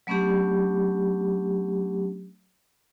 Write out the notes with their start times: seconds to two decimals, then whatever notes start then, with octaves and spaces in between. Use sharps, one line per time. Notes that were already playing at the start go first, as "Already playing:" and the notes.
0.07 F#3 A3 B3 C#4 D4 G4